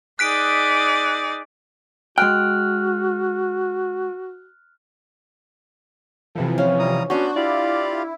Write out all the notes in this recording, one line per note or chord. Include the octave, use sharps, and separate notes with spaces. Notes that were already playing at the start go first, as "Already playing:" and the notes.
D#4 G#4 D5 F#6 B6 D7
G#3 F#4 G5 F6 F#6
C3 E3 F3 A4
C#4 F5
G3 A#5 D#6
B3 C#4 D4 F#4 C6 G6
E4 F4 G4 D5 F5